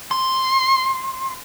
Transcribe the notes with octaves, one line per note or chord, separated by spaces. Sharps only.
C6